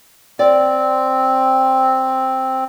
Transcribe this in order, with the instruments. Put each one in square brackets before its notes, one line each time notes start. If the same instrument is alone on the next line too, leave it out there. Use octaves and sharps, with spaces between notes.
[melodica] C4 [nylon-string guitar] D5